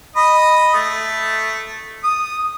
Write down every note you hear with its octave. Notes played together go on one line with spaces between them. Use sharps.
D#5 B5
A3
D#6